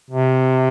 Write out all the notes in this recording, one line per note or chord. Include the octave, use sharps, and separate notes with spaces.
C3